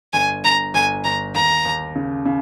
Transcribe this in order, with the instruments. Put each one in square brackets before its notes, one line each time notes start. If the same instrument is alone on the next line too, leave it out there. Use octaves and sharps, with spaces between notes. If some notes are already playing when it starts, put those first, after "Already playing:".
[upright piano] G1 [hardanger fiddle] G#5
[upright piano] G1 [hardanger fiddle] A#5
[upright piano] G1 [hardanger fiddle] G#5
[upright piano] G1 [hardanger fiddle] A#5
[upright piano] D#2 [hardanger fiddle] A#5
[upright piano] D#2
C#3
C#3